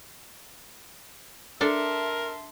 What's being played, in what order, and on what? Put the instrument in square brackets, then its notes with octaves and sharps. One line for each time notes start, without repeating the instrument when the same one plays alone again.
[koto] D4 A4 [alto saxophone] A#4 [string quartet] E5 A5 C6